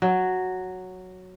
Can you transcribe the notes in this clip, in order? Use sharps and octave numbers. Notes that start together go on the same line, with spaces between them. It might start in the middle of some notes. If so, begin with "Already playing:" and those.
F#3